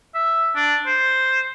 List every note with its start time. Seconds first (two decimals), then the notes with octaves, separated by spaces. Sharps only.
0.15 E5
0.56 D4
0.86 C5